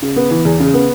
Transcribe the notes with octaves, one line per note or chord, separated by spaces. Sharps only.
C#3
B3
E3
E2
C#3
B3